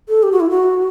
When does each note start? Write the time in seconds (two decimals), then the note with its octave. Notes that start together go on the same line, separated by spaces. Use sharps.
0.09 A4
0.23 G4
0.32 F#4
0.40 E4
0.50 F#4